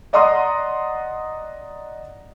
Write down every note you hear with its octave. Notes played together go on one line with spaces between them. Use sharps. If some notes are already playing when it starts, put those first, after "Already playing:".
D5 D#5 F#5 A#5 C6 D#6